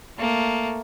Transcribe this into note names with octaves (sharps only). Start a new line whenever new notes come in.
A3 A#3